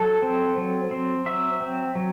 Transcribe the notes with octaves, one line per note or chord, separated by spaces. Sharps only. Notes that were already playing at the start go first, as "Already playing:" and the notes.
Already playing: F#3 A4
C4
F#3
C4
F#3 E5
C4
F#3